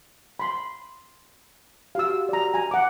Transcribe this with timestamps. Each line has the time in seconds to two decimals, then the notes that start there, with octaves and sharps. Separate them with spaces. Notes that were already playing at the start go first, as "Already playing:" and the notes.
0.39 B5 C6
1.95 F#4 G4 F5 E6
2.29 D5 A#5
2.54 G#5 A#5
2.71 F#5 D6